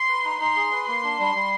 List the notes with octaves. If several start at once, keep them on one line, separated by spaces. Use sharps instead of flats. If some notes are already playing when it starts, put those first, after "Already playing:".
Already playing: C6
B4
D#4
D#4 C6
G#4
B4
A#3 C6
D4
G3
G3